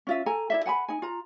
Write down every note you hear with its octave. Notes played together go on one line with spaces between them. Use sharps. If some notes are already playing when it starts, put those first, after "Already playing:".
C#4 F4 E5
A4 G#5 A#5
E4 D5 E5
F#5 G#5 A5 B5
D#4 G#5
F4 A#5